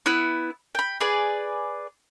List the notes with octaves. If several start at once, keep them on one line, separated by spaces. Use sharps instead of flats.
B3 E4 F#6
G5 B5
G#4 B4 D5